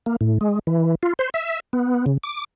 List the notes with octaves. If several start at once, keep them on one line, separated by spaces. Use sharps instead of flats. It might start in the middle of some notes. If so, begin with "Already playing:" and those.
A#3
A2
G#3
E3
F4
C5
E5
B3
C#3
D6